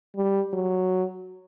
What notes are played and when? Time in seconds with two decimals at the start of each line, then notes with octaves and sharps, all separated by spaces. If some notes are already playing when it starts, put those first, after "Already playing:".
0.17 G3
0.53 F#3